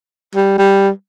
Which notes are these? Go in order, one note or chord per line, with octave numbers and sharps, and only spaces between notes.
G3
G3